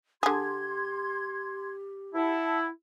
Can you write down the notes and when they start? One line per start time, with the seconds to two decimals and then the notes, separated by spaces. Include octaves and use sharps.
0.23 D3 G4 G#4 C6 G#6
2.15 E4 F#5 A5